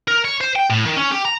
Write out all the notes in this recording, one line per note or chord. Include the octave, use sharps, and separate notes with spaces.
A#4
C#5
C5
G5
A2
D#3
C#4
G4
A#5